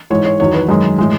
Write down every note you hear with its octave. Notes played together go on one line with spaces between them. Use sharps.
G#2 E3 G#3 C#5
C#5
E2 D#3 F#3 C#5
B4
F#2 D#3 G#3
A2 E3 G#3